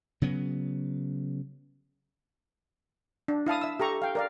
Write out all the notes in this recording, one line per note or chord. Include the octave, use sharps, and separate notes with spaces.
C#3 F#3 B3
D4
E4 F5 A5 D#6
E5 E6
G4 A4 A#5 C#6
F5 G5
A#4 D5 F5